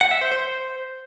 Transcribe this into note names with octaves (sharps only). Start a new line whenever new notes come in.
F#5
E5
C5
C5